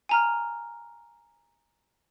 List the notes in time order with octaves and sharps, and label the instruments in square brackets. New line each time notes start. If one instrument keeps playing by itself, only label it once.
[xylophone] G#5 A#5 F6